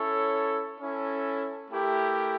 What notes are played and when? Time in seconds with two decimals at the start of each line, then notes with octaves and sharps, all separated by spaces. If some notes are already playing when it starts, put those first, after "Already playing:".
Already playing: C#4 E4 A4 C#5
0.81 C#4 E4 A4
1.71 A3 E4 G4 A#4